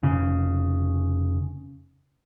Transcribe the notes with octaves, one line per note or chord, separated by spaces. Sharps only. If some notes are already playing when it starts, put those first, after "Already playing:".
F1 C#3